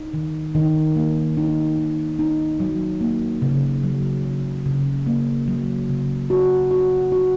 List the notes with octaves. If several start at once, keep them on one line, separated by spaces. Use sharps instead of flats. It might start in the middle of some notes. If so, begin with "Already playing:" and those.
Already playing: D#4
D#3
D#3
A#3
D#4
D#3
D#4
F#3
A#3
C#3
F#3
C#3
C#3
A#3
F#3
C#3
F#4
F#4
F#4